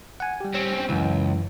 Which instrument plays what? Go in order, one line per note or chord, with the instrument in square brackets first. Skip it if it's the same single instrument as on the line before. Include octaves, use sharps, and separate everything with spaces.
[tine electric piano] F#5 G#5
G3 G4
[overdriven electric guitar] C4 C#4
[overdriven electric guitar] C#2 [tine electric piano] F#2 E3